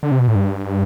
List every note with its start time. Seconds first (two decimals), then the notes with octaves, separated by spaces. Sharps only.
0.03 D3
0.11 C3
0.19 B2
0.28 A2
0.35 G2